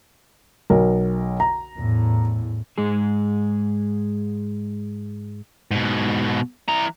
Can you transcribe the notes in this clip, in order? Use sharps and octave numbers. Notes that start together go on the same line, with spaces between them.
B1 A#4
A#5
E2 A2
G#2 G#3 G#4
G#2 B2
E3 A#5